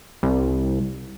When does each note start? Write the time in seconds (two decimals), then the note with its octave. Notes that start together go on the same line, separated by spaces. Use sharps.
0.23 C2